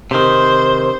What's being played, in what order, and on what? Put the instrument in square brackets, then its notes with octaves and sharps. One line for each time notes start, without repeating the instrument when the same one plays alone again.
[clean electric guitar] C3 D#3 [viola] C5